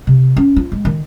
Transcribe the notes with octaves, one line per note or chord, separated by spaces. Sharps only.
C3
C#4
F4
G#3
D#3